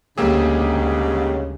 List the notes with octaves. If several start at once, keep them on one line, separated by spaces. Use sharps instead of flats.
D2 G#2 C#3 G3 A#3 G4 G#4 E6